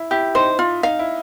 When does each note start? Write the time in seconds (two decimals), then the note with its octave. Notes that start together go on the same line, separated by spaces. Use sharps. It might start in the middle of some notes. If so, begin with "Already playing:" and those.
Already playing: E4
0.11 E4 G4
0.35 D#4 C5
0.59 F4
0.83 D#4 F5
0.99 E4